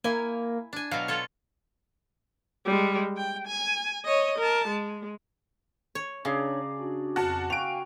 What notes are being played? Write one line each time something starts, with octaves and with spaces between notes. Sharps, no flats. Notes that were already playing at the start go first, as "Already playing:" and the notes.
A#3 E4 G#5
D4 G#5
B2 F#3 F5
F4 A4 C#5
G3 G#3
G5
G#5
C#5 D#5
A#4 A5
G#3
C#5
C#3 D4 G#4 C#5 D5 A#5
D4 F#4
F2 F#4 A#4 A5
F#4 F5 G5 G#5 C#6 D7 F7